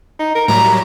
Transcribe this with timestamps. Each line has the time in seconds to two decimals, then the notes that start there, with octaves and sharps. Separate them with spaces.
0.19 D#4
0.35 A#4
0.48 A2 F#3 G3 A#5